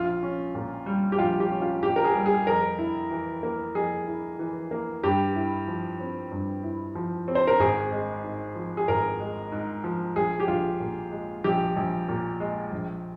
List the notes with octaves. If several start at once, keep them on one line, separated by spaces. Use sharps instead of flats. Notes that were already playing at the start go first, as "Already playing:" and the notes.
Already playing: A#1 F4
C#4
A#2
G3
G4
A#1 F4
G4
C#4
F4
A#2 G4
A#4
G#4
G3
G#4
F2 A#4
E4
E3
A#3
F2 G#4
E4
E3
A#3
G2 G4
E4
F3
C4
G2
E4
F3
C4
C5
A#4
G#1 G#4
G#3
G#2
F3
G#4
G#1 A#4
G#3
G#2
F3
A#1 G#4
G4
A#1 F4
A#2
G#3
A#1 G4
A#1
A#2
G#3
A#1